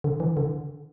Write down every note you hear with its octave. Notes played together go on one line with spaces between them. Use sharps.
D3
E3
D3